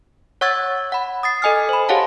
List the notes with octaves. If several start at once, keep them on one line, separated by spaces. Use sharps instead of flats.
C#5 F#5 C#6 E6 G#6 A6
F#5 B5
D#6 A6 C7
A4 D#5 G#5 D#6 F6
C5 B5
G4 G#4 C#5 F5 F#5 A5